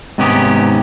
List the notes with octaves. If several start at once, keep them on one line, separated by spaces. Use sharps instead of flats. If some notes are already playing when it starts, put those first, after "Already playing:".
G#2 C3 D#3 B3 C#4 G4